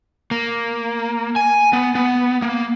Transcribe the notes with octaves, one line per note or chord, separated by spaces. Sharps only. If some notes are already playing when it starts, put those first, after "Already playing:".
A#3
G#5
B3
B3
A#3